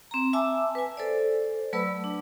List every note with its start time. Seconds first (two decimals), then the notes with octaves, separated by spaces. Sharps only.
0.11 C4 A#5
0.33 E5 G#5 A5 D6 E6
0.75 B4 G#5
0.97 A4 C5 D5
1.73 F#3 A3 B4 D5 B5 E6
2.04 D4